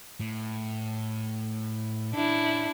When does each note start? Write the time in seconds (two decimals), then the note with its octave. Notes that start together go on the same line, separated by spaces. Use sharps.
0.20 A2
2.14 C#4 D4 E4 A4